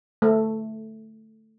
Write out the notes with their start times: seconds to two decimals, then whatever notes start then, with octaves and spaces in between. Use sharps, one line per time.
0.22 A3